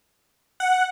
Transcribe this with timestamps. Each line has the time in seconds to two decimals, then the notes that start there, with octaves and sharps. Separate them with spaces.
0.60 F#5